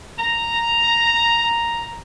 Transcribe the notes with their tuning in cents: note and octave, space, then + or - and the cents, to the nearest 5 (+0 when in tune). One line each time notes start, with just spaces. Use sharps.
A#5 +0